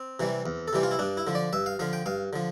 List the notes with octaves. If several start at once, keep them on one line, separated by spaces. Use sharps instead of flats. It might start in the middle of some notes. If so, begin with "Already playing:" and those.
Already playing: C4
C3 E3 G3
E2
A4
C3 E3 G3 G4
F4
E4
G2 D4
E4
D3 F3
D5
G2 E5
F5
D3 F3 F5
G5
G2 F5
D3 F3